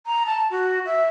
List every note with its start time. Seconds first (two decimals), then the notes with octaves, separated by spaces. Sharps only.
0.06 A#5
0.26 A5
0.51 F#4
0.86 E5